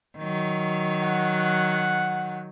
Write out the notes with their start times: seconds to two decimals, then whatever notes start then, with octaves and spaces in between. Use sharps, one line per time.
0.18 D#3 F#3
1.03 F#5